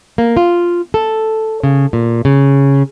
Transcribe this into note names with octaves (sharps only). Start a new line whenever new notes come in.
A#3
F4
A4
C#3
A#2
C#3